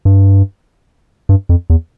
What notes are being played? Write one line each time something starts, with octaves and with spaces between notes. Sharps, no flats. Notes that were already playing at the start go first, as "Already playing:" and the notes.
G2
G2
F2
E2